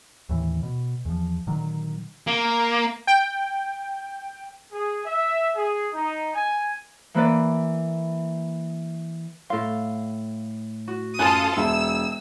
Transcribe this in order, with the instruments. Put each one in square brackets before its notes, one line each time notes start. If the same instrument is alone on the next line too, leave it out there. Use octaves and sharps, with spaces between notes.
[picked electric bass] D#2 A2 E3
B2
E2 F3
A#2 D3 D#3 F#3
[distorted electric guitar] A#3
[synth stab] G5
[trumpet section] G#4
E5
G#4
D#4
G#5
[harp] E3 A#3 B4 D5
[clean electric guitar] A2 C6 [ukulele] A4 F5
[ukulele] F#4
[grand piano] F#2 G#5 F#6 [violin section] F4 A4 D#6
[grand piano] E1 [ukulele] E5 [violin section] E6